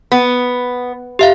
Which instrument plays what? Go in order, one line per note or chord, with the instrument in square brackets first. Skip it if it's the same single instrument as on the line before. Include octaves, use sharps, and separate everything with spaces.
[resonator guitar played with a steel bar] B3
[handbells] G4 E5 F5